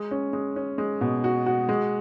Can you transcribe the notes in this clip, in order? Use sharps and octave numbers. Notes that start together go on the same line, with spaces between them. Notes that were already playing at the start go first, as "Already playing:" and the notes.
Already playing: G#3
C#4
G#3
C#4
G#3
B2
F#4
F#4
G#3